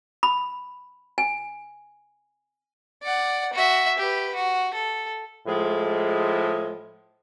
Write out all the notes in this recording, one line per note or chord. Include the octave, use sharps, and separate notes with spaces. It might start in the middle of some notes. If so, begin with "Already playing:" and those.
B5
G#5
D5 F#5
F#4 E5
G4 B4
F#4
A4
A2 F3 G#3